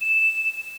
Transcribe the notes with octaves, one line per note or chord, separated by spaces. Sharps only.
E7